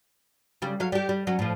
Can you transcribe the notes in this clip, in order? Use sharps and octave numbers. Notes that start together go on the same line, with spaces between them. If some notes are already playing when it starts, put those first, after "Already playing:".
C#3 G3
F#3 F5
G3 G4
G3
F#3 C#4
A2 F3